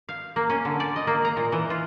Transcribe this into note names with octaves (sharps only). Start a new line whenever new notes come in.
F5
A#3
C#4
D3
D5
D#5
A#3
A#5
A#2
E3
F4